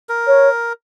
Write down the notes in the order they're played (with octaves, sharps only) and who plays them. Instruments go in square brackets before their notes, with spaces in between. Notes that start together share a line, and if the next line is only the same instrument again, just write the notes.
[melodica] A#4
[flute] C#5